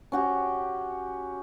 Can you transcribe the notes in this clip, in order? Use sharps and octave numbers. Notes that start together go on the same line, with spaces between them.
C#4 F#4 G4